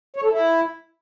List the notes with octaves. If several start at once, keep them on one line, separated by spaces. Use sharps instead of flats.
C#5
A4
E4